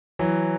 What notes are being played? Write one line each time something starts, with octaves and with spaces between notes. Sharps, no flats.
E3 F#3